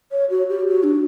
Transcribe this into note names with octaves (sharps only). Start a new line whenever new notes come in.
C#5
F#4
G4
F#4
D4